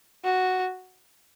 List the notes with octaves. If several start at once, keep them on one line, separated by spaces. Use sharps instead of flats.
F#4